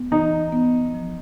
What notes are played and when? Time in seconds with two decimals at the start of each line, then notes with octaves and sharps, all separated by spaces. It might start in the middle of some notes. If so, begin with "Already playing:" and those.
Already playing: B3
0.11 E3 D#4
0.53 B3
0.94 F3